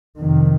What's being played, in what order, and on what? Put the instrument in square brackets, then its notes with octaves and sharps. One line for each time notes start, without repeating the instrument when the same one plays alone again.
[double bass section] F2 C3 D#3